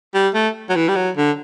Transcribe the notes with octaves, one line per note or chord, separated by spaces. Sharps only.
G3
A3
F#3
E3
G3
F#3
D3